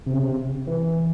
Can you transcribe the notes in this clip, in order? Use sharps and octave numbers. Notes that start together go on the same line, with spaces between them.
C3
C#3
C3
E3